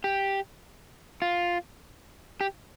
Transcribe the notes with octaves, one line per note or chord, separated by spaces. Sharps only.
G4
F4
G4